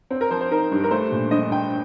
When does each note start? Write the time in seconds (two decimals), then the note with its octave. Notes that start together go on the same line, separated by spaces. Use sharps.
0.11 C4
0.21 A#4
0.31 F3 C5
0.41 C5
0.51 D#4 A#4
0.72 G2
0.84 A#4
0.91 A3 C5
1.12 A#2
1.31 A#1 D#5
1.51 A#1 G5